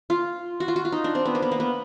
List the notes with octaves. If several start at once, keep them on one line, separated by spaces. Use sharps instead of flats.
F4
F#4
F4
F#4
F4
D#4
D4
C4
B3
A#3
B3
A#3
B3